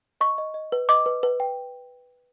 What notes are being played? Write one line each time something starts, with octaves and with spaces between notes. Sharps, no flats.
D#5 C#6
D#5
D#5
B4
D#5 D6
B4
B4
G5